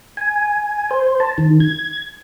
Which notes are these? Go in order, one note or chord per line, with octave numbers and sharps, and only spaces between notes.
G#5
C5
A5
D#3
G#6